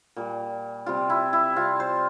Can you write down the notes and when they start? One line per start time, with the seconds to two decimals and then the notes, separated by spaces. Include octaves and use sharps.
0.16 A#2 G3
0.86 C3 G3 F4
1.10 E4
1.33 E4
1.56 C3 G3 F4
1.80 C5